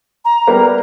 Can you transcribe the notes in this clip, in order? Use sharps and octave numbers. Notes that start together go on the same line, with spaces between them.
A#5
G3 A#3 B3